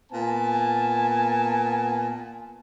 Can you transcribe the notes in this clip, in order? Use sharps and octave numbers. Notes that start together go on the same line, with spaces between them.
A#2 B3 G#5 A5